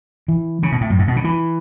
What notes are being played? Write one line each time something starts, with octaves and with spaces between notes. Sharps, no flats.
E3
C#3
B2
A2
F#2
G#2
B2
C#3
E3